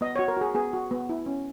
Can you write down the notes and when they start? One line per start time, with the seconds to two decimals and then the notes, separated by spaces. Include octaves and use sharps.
0.01 B3 D#5
0.16 F#4 C#5
0.28 A#4
0.37 F#4 G#4
0.55 B3 G#4
0.73 F#4
0.91 B3
1.09 E4
1.26 C#4